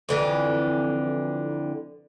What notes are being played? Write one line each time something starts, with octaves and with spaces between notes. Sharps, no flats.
F2 D3 E3